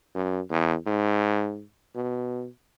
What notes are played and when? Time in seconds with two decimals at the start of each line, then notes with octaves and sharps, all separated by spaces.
0.15 F#2
0.50 E2
0.86 G#2
1.95 B2